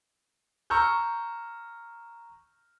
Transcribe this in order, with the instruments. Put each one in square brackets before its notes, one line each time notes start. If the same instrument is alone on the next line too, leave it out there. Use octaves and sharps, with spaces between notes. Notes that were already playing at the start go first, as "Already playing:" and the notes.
[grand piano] A#5 C#6 E6 F6 G6